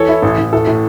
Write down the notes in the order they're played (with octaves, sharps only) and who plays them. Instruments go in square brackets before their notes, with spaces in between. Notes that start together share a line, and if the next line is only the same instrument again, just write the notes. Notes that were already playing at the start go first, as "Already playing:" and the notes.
Already playing: [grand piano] E3 [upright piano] A4 C#5
[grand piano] E4
A1
A1
[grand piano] A2 [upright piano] A4
[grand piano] A2